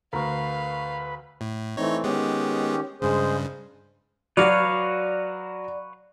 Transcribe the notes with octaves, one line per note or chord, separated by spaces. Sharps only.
D2 A#4 B4 F5 C#6
A2
E3 A3 C4 D#4 C#5
D#3 G#3 B3 C#4 G4
G2 C#3 G#3 G#4 C5
F#3 F#4 B4 C#5 D5 F5